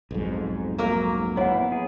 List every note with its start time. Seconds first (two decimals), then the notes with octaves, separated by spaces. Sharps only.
0.11 B1 F2 G#2
0.78 F#3 A#3 A#4
1.37 B3 E4 C#5 F#5
1.72 G#4